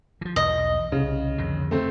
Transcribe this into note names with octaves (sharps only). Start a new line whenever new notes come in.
E3 F3
B1 E2 B2 D#5
C2 C#3
F2 D3 D#3
A3 C4